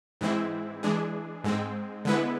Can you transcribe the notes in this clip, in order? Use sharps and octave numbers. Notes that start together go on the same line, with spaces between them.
G#2 E3 G#3 C4 E4
E3 G#3 D4 G#4
G#2 G#3 C4
D3 G#3 B3 E4 B4